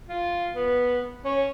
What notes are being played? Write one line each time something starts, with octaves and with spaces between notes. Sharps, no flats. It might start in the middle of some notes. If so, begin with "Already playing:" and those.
F4
B3
C#4